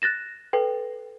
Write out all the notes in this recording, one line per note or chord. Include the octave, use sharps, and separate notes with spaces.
F#6 A6 A#6 E7
A4 B4 G5